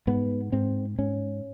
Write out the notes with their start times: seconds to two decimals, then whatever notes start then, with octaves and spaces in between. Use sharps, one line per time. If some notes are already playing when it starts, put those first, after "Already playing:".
0.07 G#2 B3
0.52 G#2 C4
0.98 G#2 C#4